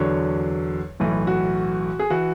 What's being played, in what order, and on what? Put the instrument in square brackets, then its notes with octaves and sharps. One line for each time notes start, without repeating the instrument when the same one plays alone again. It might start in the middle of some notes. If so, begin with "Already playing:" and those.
Already playing: [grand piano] E2 D3 F#3 C#5
B1 A2 E3
F#4
G#4
E3 F#4